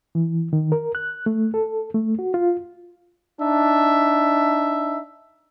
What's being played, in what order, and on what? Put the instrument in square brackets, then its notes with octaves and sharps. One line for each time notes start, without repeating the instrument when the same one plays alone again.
[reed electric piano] E3
D#3
A#4
F#6
A3
A4
A3
F#4
F4
[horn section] D4 D#4 E5